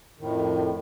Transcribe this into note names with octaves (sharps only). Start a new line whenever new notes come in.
F2 A2 D#3